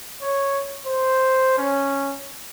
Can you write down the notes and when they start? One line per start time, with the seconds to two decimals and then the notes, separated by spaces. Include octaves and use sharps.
0.22 C#5
0.87 C5
1.58 C#4